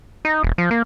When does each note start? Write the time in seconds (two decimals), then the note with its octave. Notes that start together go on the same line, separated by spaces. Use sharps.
0.25 D#4
0.43 E1
0.58 F3
0.71 A#3